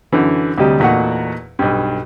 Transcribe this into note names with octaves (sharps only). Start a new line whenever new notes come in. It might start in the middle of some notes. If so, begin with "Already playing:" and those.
F#2 D3 E3
D2 C3 F#3 G3 D#5
E2 A#2 A3 D#4 F#4 F#5
B1 G2